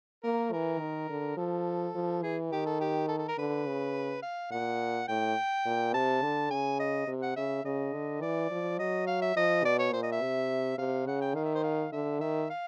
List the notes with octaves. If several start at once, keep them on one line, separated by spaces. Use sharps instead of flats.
A#3 A#4
E3 A#4
D#3
D3
F3 A4
F3
E3 G#4
D#3 G4
A4
G4
A4
A4
A#4
D3 B4
C#3
F5
A#2 F#5
A2 G5
A#2
C3 A5
D3
C#3 G#5
D#5
C3
F#5
C#3 E5
C#3 D#5
D3
E3 D5
F3
F#3 D#5
F5
E5
F3 D#5
B2 D5
C#5
A#2 C5
D#5
E5
C3
C3 F5
C#3 F#5
G5
D#3 F5
E5
C5
F5
D3 E5
D#3 E5
F5